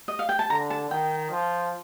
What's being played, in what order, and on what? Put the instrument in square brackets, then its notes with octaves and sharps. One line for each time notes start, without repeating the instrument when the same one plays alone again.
[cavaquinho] D#5
F5
G5
A5
[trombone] D3 [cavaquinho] A#5
[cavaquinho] A5
[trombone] D#3 [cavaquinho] G5
[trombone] F3